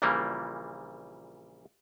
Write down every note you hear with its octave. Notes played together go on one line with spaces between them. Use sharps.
A#1 A#2 C#3 E3 G3 A#3